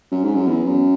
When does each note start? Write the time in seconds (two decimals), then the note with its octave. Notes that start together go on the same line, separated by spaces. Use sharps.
0.11 F#2
0.23 G#2
0.35 F#2
0.47 E2
0.65 F#2